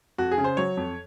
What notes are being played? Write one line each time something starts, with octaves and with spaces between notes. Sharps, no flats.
F2 F#4
G#4
C#3
C5
F#3 C#5
F2